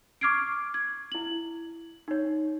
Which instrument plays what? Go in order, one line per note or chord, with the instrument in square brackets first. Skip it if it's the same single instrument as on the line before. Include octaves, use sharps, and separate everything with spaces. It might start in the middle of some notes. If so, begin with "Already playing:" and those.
[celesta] C#6 D6 F6 G#6 C7 D7
G#6
E4 F#7
D#4 C#5